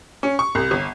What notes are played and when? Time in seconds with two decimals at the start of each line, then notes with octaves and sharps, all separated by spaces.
0.23 C#4
0.39 C#6
0.55 C2
0.71 G1